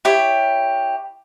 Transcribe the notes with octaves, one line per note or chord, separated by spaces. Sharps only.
E4 G4 C#5